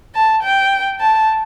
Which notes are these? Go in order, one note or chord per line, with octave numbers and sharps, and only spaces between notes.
A5
G5
A5